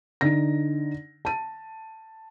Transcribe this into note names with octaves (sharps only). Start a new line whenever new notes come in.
D3 D#4 A#6
A5 D#7